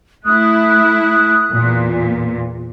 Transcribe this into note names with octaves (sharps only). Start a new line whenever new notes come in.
A3 E4 D#6 F#6
E2 A#2